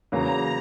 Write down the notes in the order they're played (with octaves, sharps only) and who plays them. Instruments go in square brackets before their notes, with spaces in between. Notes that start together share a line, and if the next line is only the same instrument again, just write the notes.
[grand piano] E2 C#3 F#3 A#3 [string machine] A#5